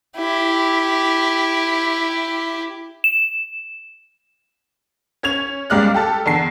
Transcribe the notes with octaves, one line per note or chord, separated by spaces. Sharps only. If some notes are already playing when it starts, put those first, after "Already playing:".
E4 G4
E7
C#4 G#6 F7
C#2 G3 G#3 D5 F6 F#6
G4 A4 A5
E2 D3 C7